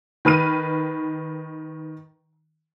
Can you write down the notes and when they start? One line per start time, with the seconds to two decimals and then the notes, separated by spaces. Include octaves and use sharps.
0.25 D#3 B4 F6 D#7